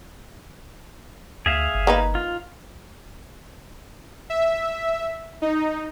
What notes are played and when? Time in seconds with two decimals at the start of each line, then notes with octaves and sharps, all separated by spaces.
1.46 D2 G#4 E5 F5
1.75 G1
1.87 A#3 D#4 B4
2.15 F4
4.30 E5
5.42 D#4